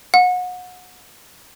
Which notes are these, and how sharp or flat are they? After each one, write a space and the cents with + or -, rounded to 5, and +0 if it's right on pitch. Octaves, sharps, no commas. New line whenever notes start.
F#5 -30